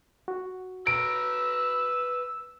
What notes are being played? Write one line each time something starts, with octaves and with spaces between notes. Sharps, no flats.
F#4
B4 A#5 E6 D7